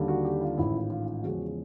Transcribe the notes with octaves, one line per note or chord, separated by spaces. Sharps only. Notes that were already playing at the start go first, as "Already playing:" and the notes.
Already playing: D#2 D3 G3
F#4
G4
F4
A1 G#2 D#3 E4
F4
F4
F4
E2 C#3 F3 G#3 F#4